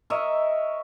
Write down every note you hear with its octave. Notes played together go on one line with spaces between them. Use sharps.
A#4 C#5 D#5 E5